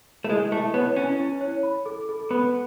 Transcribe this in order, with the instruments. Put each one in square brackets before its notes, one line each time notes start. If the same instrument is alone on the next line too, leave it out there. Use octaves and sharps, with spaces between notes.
[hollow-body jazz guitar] A3
[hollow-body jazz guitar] G#3 [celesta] E4
[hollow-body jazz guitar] A3 [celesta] E4
[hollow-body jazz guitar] B3 [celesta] C#5
[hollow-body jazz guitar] C#4 [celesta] E4
[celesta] E4
C#5
B5
A4
A4
[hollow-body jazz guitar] B3 [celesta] B5